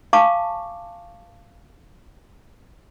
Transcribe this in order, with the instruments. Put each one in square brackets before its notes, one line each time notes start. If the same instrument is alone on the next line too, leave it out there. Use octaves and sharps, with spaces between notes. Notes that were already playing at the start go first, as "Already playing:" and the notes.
[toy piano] F5 G#5 A5 C#6 D6